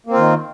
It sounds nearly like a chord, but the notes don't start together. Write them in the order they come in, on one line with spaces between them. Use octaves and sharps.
A#3 C4 F4 D#3